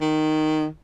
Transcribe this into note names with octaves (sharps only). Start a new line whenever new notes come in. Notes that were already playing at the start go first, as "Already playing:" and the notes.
D#3